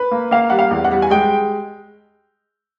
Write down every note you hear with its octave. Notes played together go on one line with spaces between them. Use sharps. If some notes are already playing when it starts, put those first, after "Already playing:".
Already playing: B4
A#3
A#3 F5
G3 F#5
F5
E2
F#5
G3
G#5
G#3 G5